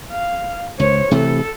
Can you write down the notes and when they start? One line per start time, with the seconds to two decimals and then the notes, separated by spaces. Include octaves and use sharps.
0.12 F5
0.80 C#2 C5 C#5
1.11 C3 E3 A3 A4